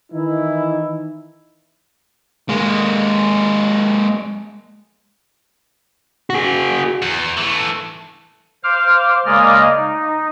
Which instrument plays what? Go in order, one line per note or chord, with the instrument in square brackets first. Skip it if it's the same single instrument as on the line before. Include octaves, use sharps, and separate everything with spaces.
[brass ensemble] D#3 E3 D#4 E4
[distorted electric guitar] G#3 A#3
[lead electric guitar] F#4 G#4
[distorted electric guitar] E2
E3 A3
[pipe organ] C5 F5 D6 F6
C#3 G#3 A#3 D5 D#5 F6
D#4